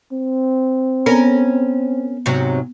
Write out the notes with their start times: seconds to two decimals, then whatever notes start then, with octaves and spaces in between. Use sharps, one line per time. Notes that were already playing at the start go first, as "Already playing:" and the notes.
0.13 C4
1.06 B3 C#4 A#4
2.26 G#2 C3 F#3